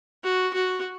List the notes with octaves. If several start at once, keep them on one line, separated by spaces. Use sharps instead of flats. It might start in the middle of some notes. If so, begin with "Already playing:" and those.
F#4
F#4